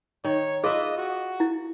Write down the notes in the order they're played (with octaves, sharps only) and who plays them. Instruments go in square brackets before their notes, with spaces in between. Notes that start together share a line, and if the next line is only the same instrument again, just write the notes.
[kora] D#3 [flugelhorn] C#5
[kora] F4 B4 E5 [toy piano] G#4 [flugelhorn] D#5
[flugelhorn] F#4
[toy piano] E4